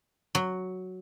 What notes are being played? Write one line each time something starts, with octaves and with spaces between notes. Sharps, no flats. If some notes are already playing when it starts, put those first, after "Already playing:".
F#3